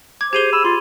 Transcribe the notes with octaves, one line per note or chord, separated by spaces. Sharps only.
D6 G#6
G4 G#4 C5 G#6 D#7 F7 G7
B5 E6
F4 C6